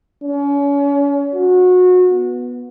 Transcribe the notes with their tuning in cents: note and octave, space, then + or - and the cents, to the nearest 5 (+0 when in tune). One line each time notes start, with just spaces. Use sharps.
C#4 +35
F#4 -25
B3 -5